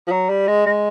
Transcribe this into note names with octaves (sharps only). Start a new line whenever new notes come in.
F3
F#3
G3
G#3
G#3